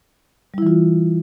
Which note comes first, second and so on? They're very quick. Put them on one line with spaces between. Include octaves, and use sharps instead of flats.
G3 E4 E3 F4